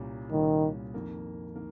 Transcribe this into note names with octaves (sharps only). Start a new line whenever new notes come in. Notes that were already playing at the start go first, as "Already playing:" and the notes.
Already playing: C2 A#2 G3 C#4
C2 A#2 D#3 G3 C#4
F2 D#3 A#3
D#3 A#3